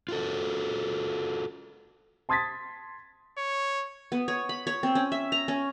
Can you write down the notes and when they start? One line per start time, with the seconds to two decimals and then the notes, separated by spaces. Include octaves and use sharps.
0.09 F4 F#4 A4
2.29 A5 C6 D#6 G#6 A6 B6
3.38 C#5
4.12 B3
4.28 C#5
4.49 B5
4.67 C#5
4.83 C4
4.95 C#4
5.12 E5
5.32 A#5
5.48 C#4